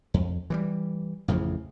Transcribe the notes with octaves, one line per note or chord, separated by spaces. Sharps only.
F2
E3 F3 G3
A1 F2 C#3 F3